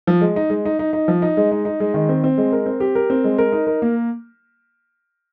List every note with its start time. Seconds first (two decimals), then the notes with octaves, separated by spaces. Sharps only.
0.07 F3
0.21 G#3
0.36 D#4
0.50 G#3
0.65 D#4
0.79 D#4
0.93 D#4
1.08 F3
1.22 D#4
1.37 G#3
1.52 D#4
1.65 D#4
1.80 G#3
1.94 D#3
2.09 C4
2.24 C4
2.38 G#3
2.52 A#4
2.66 C4
2.80 G4
2.95 A#4
3.10 C4
3.24 G#3
3.38 A#4
3.52 D#4
3.67 A#4
3.82 A#3